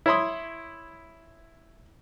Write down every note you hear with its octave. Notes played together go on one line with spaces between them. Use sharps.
E4 C#5 B5 C6 D#6